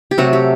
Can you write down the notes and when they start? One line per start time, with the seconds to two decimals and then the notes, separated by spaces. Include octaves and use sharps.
0.11 G4
0.18 C3 F#3 A3 F#4
0.33 G4